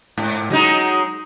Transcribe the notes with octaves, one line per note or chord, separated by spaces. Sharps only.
G#2
F#3 G#3 D#4